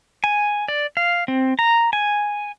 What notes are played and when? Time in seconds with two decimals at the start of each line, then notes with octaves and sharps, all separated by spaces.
0.24 G#5
0.68 D5
0.97 F5
1.28 C4
1.59 A#5
1.93 G#5